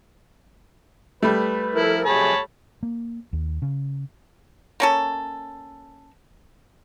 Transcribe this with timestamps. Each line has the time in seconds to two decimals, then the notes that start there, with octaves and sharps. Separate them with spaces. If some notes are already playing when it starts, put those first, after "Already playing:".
1.23 G3 A3 B4
1.74 F3 E4 A4 A#4
2.05 F2 C3 F#3 G#4 C#5 A5 B5
2.83 A#3
3.33 D#2
3.62 C#3
4.80 A#3 C#4 A4